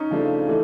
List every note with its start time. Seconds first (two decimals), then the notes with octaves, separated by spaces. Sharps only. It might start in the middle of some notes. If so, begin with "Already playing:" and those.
Already playing: C#4 D#4
0.11 C#3 F3 A3 D4
0.48 E3 A3